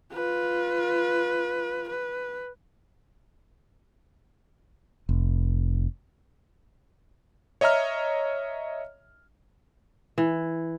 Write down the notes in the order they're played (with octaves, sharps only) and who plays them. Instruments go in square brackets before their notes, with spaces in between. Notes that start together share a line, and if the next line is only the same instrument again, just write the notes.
[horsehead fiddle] F4 B4
B4
[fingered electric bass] F1
[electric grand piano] C#5 D#5 E5 A#5 F6
[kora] E3